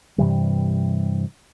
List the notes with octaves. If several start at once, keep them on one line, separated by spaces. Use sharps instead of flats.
G2 C3 E3 G3